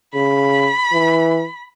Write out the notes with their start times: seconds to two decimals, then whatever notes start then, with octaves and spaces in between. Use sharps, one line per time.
0.14 C#3 B5
0.93 E3